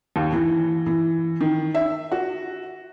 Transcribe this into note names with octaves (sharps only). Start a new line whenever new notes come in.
D#2
E3
E3
D#3
E5
F#4